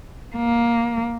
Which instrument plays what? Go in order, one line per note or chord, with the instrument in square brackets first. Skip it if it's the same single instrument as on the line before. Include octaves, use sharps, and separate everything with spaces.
[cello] A#3